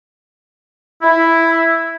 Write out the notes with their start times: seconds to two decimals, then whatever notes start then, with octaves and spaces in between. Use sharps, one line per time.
1.02 E4